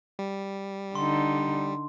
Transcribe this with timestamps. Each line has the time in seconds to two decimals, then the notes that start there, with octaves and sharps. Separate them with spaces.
0.19 G3
0.95 D3 D#4 C6